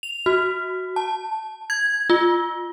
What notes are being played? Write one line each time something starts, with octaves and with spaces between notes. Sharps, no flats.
F7
F#4
A5
G#6
F4